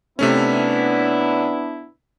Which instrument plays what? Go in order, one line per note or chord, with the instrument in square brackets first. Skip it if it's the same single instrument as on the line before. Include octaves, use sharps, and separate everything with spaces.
[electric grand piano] C3 A3 C#4 [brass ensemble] B3 D4 E4